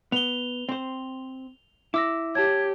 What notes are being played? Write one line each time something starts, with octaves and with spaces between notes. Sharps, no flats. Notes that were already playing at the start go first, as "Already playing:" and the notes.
B3 F7 G7
C4 C5
E4 D6 E6 A#6
G4 C#5 A5 G#6